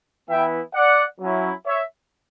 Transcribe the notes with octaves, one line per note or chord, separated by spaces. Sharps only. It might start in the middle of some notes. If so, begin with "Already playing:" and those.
E3 B3 E4 E5 G5
D5 F#5
F#3 C#4 E4
C#5 E5